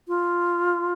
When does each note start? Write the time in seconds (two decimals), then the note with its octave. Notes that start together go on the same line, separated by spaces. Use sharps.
0.08 F4